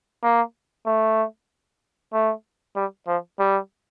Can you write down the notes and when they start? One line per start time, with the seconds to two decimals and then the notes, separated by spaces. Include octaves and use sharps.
0.23 A#3
0.86 A3
2.13 A3
2.76 G3
3.07 F3
3.39 G3